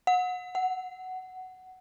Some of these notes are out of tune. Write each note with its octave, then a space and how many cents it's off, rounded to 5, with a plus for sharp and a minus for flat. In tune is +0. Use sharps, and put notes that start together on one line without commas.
F#5 -25
F#5 +10